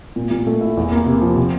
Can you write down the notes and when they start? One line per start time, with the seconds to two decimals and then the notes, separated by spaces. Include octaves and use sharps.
0.16 A#2
0.31 A#2
0.47 A3
0.61 E4
0.77 E2
0.92 A#3
1.06 C3
1.21 F3
1.36 C3